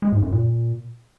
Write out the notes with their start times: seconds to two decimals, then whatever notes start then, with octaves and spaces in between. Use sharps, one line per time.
0.02 G#3
0.12 G#2
0.22 F#2
0.32 A#2